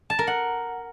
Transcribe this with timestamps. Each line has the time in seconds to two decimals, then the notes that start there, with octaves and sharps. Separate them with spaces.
0.10 A5
0.19 A#4
0.27 F#5